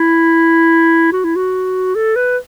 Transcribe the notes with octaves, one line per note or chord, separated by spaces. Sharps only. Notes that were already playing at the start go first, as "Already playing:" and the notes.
Already playing: E4
F#4
E4
F#4
A4
B4